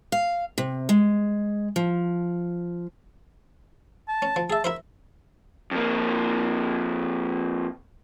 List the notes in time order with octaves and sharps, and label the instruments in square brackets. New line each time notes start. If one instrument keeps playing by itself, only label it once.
[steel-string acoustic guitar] F5
C3
G#3
F3
[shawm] A5
[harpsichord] C#4
F3
[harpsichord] G#4 E5 [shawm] A5
[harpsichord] E4 A#4 C5 [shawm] E5
[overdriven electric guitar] F2 A#3